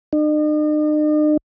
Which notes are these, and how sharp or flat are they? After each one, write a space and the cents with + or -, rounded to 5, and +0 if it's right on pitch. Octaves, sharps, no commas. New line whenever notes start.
D#4 -45